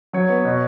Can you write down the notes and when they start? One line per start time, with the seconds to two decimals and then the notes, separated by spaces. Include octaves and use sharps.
0.13 F#3 C#5
0.29 B3
0.45 B2